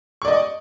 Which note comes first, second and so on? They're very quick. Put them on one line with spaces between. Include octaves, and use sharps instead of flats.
C#6 D5 D#5